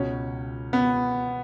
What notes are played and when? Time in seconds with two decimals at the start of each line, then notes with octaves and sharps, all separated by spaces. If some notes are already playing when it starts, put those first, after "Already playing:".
Already playing: C#2 B2 C#4
0.73 B3